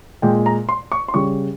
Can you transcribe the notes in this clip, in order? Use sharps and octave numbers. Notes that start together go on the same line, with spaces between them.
A#2 G#3 G5
A#5
C6
C#6
C6
C#3 G3 C#6